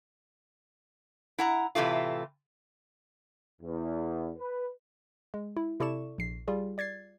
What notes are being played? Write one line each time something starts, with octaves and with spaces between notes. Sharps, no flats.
E4 F#5 A#5
A2 C3 E3 A3 F4
E2
B4
G#3
E4
C3 E4 A4 D5 C#6 E7
A#1 C7
G3 F4 G#4
D5 G#6 A6 C7